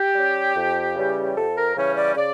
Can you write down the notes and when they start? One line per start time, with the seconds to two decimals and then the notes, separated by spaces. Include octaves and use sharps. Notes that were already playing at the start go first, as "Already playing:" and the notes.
Already playing: G4
0.15 G3 C#4
0.56 F2
0.95 C#3 E3 G3 C#4
1.35 F2 A4
1.56 A#4
1.76 C#3 E3 G3 C#4 C#5
1.95 D5
2.16 C#3 D5